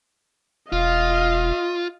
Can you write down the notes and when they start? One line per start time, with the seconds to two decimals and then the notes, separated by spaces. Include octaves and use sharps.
0.72 E1 F4 D#5 F5